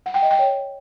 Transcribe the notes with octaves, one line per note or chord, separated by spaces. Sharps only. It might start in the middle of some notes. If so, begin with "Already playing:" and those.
F#5
G5
D#5
G5
C#5